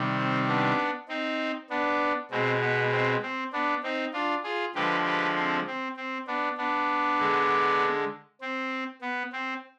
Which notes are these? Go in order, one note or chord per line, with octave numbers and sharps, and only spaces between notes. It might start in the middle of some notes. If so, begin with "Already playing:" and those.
Already playing: C3 D#3 G3
C4
B3 D4
C4 D#4
B3 D4
B2 G#3 C4
B3
C4
C4
B3 D4
C4 D#4
D4 F4
F4 G#4
D3 F3 G#3 G4 B4
G4 B4
C4
C4
C4
B3 D4
B3 D4
D3 G#3
C4
B3
C4